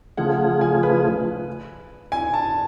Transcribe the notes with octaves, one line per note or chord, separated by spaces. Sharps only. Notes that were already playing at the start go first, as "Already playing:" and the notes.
C#3 F3 A3 F4 G#4 F#5
G#5
B4
G#5
A5